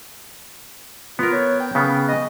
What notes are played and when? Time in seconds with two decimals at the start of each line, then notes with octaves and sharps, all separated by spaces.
1.19 B3 F4 A#4
1.32 C#5
1.60 G5
1.75 C#3 B3
2.08 D#5